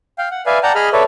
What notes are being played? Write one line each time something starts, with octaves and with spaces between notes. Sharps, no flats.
F5 G5
F#5
B4 D5 E5 F5 G#5
D5 F#5 G5 A5 A#5
G#4 D#5 B5 F6
A4 B4 C#5 D5 E5